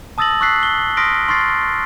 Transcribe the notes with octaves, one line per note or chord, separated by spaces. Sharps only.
A5 D#6 E6 A6 A#6 F#7
C#6 E6 F#6 B6 C7
G7
C6 D#6 F6 A#6 B6 D7
C6 C#6 F6 A6 C7